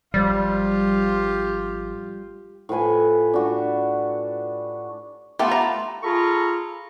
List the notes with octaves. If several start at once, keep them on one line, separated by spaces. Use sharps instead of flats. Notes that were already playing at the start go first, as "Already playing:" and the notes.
G#1 F3 G3 F4 G4
A2 F3 B4 G#5
D4 F#4 G4
A3 B3 F4 G4
A#5
F4 G#4 A4 A#5 B5 C#6